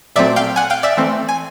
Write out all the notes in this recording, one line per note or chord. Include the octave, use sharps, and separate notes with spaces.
A#2 F#3 A3 C4 D5 E5
F5 G5
F#5 G#5
F5 G5
D5 E5
E3 A3 C4
G#5